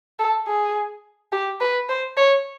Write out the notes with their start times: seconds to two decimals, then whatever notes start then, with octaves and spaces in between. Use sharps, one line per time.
0.19 A4
0.48 G#4
1.32 G4
1.61 B4
1.89 C5
2.17 C#5